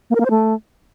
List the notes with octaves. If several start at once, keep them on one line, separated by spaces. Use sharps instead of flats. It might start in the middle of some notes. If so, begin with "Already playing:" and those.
A#3
A#4
A#3
C5
A3